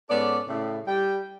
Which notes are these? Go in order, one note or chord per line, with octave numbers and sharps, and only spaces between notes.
G#2 B3 C#4 A4 D5
A2 C#3
G3 G5